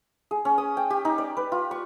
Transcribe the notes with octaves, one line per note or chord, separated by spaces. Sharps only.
G#4
C#4
D#6
G5
G4
D#4
D5
B4
F4
C#6